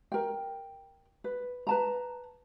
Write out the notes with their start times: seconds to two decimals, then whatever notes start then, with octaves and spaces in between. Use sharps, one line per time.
0.12 A#4 G5
1.24 B4
1.67 B4 A5 A#5